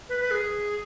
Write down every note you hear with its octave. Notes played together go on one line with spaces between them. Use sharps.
B4
B4
G#4